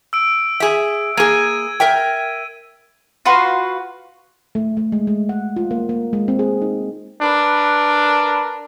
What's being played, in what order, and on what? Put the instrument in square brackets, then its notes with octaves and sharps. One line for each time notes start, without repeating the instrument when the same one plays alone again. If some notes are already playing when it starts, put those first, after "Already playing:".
[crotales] E6 D7
[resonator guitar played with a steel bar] G#4 E5
[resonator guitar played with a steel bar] A#3 G#4 [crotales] G#6 D#7
[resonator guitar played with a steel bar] A#4 E5 G5
[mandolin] F4 F#4 B4 C6
[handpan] A3
A3
G#3
G#3
F#5
F4
A#3
A#3
G#3
C4
G#4
D#4
[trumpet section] D4 A#4 B4